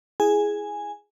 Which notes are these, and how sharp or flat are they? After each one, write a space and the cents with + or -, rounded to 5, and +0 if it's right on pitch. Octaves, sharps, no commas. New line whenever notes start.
E4 +0 G#4 +0 G#5 -5